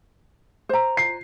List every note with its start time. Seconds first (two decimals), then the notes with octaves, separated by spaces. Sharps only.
0.69 C5 A#5
0.97 C7